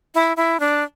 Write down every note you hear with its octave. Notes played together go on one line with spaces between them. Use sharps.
E4
E4
D4